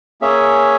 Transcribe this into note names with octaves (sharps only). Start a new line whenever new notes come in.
A#3 C#4 G#4 C#5 E5